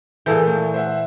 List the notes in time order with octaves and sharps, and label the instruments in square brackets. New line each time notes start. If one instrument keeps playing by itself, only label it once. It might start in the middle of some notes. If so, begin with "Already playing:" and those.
[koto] A#2 E3 [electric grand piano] G#4 A4 G6
[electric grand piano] A3
C5 E5 F#5